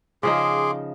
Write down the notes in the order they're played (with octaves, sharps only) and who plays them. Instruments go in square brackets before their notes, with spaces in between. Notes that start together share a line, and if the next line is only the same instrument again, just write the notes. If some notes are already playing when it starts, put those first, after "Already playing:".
[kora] C#3 F3 D#4 [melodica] G#4 C6 D6